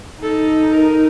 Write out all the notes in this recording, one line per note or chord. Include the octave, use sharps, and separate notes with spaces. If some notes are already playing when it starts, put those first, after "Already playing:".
D#4 A4
A#4